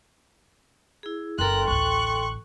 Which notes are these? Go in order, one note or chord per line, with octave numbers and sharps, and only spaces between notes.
E4 G#4
F#1 A4 A#4 G5 C6 F#6
A1 D2 C#6 F#6